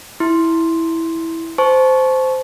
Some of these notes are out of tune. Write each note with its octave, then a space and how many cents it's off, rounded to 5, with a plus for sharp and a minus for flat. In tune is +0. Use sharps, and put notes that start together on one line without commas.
E4 -5 C6 +0
C5 -10 A5 -25 C#6 +0